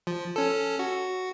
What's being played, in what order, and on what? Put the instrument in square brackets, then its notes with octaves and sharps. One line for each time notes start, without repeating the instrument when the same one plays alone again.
[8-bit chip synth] F3
C#4 A4
F#4